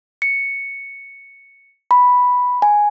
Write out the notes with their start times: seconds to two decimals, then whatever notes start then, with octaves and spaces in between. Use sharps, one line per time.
0.22 C#7
1.91 B5
2.62 G#5